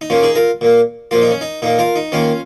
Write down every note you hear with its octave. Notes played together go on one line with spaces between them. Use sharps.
D#4
A#2 A#3 C#4 F4
D#4 G#4
F4 A#4
A#2 A#3
A#2 F3 A#3 F4
D#4
C#4
D#4
A#2 A#3 D#4
F4 A#4
D#4
D#3 A#3 C#4 F4